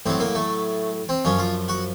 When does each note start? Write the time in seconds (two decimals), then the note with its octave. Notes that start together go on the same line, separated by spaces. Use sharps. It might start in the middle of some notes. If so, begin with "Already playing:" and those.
0.06 A2 F#3 C4
0.20 A#3
0.35 A3
1.09 C4
1.25 F#2 F3 C#4
1.38 F4
1.69 F#4